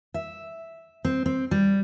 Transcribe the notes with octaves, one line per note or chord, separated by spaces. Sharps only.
E5
C4
C4
G3